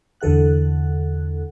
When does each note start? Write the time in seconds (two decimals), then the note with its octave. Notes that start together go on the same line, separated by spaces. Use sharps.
0.21 E2 D3 A4 F#5 F#6